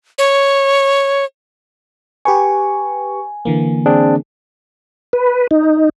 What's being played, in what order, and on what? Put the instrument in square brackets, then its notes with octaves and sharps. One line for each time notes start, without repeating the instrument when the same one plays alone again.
[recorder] C#5
[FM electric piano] G4 B4 C#6 [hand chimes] G#5
[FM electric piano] D3 E3 A#3
[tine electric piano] C4 D4 G#4
[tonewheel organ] B4
D#4